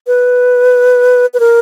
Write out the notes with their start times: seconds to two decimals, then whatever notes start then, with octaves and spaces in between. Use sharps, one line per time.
0.07 B4
1.34 B4
1.40 A#4